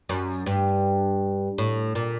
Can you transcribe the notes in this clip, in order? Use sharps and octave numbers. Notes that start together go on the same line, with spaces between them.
F#2
G2
A2
A#2